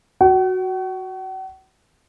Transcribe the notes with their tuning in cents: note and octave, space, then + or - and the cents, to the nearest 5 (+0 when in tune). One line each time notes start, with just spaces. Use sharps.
F#4 +0 F#5 +45